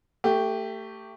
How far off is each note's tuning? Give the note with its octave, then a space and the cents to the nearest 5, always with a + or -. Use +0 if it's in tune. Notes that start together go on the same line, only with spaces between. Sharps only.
A3 +20 G4 +0